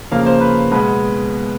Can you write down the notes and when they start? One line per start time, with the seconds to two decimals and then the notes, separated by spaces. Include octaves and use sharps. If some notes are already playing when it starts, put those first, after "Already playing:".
0.11 C#3 F3 A#3 F5
0.26 C5
0.41 B4
0.71 B2 G#3 B3 B4